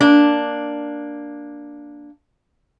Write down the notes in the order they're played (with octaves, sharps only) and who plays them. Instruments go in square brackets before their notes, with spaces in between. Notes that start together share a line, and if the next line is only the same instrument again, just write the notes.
[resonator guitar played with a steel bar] A#3 D4